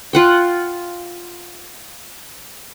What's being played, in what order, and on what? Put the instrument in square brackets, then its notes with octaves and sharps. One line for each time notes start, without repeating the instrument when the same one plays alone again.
[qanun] F4 F#5 G5